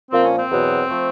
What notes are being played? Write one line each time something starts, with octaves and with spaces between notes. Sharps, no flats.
A#2 F3 A#3 C4
C#4
C4
E2 B2 F#3 B3
F3 A3